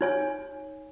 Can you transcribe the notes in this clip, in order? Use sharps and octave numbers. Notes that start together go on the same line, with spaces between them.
D#4 C#5 G#5